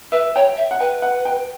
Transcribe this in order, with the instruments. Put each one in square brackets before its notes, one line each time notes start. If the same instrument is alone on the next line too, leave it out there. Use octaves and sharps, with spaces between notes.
[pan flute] B4 [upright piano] E5
[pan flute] C#5 [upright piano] G5
[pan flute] E5
[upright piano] F#5
[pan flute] B4 [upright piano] G5
[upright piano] F#5
G5